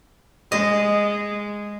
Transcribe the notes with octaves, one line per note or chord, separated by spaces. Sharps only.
G#3 D#5